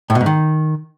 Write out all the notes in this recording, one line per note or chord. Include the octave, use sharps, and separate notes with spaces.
A2
B2
G#2
D#3